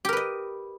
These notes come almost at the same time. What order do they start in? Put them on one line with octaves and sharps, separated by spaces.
G4 A#4 B4 D#5